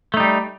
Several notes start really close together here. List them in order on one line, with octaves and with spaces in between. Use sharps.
A3 D#4 G3